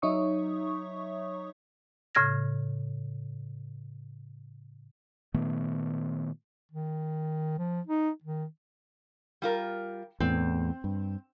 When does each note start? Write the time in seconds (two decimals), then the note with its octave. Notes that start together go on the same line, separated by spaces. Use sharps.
0.02 F#3 D#4 C#5 E5 C#6 D#6
2.15 A2 C#3 F6 G#6 A#6
5.34 A#2 D#3 A3 B3
6.72 D#3
7.58 F3
7.87 D#4
8.24 D#3
9.42 G3 F4 A#4
10.20 E2 A2 C4
10.84 G2